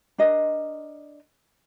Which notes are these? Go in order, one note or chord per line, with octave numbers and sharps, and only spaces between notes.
D4 A#4 D#5